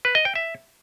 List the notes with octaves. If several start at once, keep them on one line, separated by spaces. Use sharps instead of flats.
B4
D#5
G5
E5